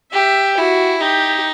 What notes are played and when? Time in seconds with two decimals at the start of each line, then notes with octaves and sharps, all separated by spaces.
0.12 G4 E5
0.58 E4 F#4
1.01 D#4 G4